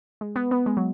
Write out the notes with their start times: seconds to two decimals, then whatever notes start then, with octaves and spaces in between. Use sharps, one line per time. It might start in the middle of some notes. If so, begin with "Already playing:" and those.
0.21 G#3
0.36 B3
0.51 B3
0.66 G#3
0.77 F#3